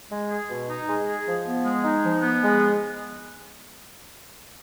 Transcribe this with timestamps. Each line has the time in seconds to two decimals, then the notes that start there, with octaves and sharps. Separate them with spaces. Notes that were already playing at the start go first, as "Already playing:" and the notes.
0.10 G#3
0.30 G#4
0.48 B2
0.68 D#4
0.88 G#3
1.07 G#4
1.26 F3
1.45 B3
1.65 G#3
1.83 D#4
2.03 F3
2.22 B3
2.43 G#3